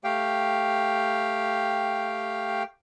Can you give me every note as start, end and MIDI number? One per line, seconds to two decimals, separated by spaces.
0.04 2.63 57
0.04 2.63 67
0.04 2.63 77
0.04 2.63 79